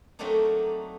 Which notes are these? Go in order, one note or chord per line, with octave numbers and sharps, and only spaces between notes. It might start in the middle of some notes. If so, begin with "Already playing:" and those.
F#3 A3 A#3 C4 D4 D#4